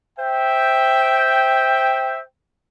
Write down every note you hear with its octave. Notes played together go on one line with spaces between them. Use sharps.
C5 E5 G5